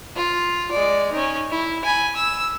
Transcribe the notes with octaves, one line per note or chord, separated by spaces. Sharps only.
F4
G#3 D5
C#4 D#4
E4
G#5 B5
E6